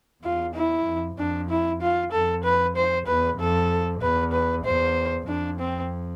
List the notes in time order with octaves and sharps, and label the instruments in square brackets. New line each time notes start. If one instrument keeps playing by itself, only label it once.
[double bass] E2 [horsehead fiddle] F4
[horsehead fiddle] E4
[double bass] F2
[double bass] F2 [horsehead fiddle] D4
[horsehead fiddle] E4
F4
[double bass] F2 [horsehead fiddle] A4
[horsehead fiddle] B4
C5
[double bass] E2 [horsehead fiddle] B4
[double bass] F2 [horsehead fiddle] A4
[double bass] E2 [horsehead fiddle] B4
[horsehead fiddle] B4
[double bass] E2 [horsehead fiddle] C5
[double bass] F2 [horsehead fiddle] D4
[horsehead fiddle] C4